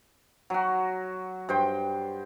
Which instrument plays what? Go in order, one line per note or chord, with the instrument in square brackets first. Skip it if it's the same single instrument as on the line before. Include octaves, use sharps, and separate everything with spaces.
[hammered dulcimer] F#3 F#4
G2 C5 G5